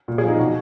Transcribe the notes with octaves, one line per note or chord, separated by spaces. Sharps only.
A#2
G#4
F3 D#4
B2 F#4